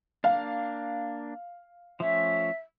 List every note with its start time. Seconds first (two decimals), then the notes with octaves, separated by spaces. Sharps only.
0.24 A#3 D4 F5
2.00 F3 A3 C#4 E5